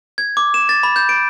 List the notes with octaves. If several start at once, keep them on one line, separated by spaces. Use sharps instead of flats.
G#6
D6
E7
A6
B5
G6
D7